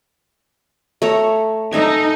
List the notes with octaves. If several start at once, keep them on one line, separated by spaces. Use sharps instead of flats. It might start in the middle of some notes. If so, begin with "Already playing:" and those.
A3 C#5 A#5
D#4 A4 E5 G#5